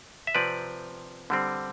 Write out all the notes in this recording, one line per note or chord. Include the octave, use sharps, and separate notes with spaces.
E5
C3 F3 C4 B4 D5
D3 G3 C4